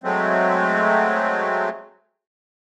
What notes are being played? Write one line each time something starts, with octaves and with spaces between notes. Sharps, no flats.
F#3 G#3 A3 C4